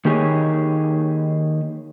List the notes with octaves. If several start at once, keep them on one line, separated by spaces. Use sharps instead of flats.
D#3 A#3 D#4 G4 G#4 C#5